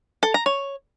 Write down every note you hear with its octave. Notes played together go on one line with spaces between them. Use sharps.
A4
A#5
C#5